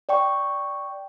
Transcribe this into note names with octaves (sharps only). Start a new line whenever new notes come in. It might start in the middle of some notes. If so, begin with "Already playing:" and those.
D5 G5 C#6